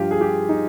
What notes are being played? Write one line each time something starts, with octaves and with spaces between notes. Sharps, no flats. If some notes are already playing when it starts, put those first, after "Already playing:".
Already playing: G2 F3 F4 G4
G#4
G4
D#4